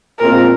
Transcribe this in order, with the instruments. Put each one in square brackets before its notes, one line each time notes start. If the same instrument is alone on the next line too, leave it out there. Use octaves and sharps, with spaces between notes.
[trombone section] A#2 G#3 C4 F4 [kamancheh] A#4